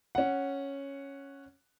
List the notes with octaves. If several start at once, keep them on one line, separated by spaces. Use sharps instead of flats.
C#4 F#5